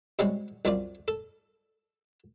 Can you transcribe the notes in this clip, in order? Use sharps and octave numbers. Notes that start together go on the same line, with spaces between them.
C3 G3 G#3 C4 C#4 F#4
C2 F#2 C4 F4 D5
A4